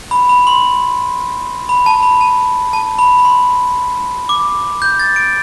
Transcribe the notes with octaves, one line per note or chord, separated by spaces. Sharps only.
B5
B5
C6
B5
A5
B5
A5
A5
B5
B5
C6
D6
G6
A6
D7